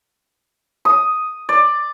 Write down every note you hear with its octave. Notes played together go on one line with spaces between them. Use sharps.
D#6
D5